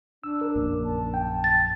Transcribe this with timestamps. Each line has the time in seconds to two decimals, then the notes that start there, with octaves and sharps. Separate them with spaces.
0.24 D4 E6
0.41 A#4
0.55 A#1 F#2 A#3
0.85 A5
1.14 G5
1.44 A6